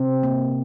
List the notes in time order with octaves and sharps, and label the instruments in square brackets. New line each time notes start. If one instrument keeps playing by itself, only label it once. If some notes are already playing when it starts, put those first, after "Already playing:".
Already playing: [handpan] C3 C4
A#3